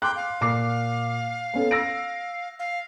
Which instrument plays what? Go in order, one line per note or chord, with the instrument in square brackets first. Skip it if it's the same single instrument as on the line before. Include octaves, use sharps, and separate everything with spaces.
[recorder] G5 [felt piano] C6 D6 F#6
[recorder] F5
[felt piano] A#2 D6 C7
B3 C#4 A4
E6 A#6 D7
[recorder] F5